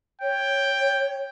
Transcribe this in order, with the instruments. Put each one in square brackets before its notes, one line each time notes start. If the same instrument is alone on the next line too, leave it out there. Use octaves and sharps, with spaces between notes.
[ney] C#5 [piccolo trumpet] G5